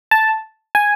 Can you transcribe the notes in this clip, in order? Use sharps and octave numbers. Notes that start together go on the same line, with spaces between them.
A5
G#5